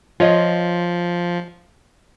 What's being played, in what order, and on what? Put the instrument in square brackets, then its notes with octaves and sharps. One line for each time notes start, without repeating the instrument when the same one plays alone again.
[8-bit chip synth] F3 [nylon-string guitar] F4 C#5 D#5